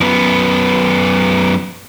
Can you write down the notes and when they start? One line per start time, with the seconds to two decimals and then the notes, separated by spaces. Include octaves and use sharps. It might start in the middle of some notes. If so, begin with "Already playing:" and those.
0.01 F#2 B3